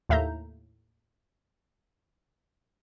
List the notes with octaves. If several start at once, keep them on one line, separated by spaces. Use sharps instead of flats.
D#2 A2 E5 F5 A#5 G6